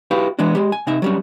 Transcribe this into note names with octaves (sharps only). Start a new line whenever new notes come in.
E4 F#4 G4 B4 F5
E3 G#3 B3 D4 F#4
G#3 G4
G#5
C3 D#4 E5
F#3 G3 C#4